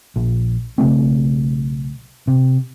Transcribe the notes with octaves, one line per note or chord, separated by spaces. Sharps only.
A#1
B1 C#3 A3 C4
C3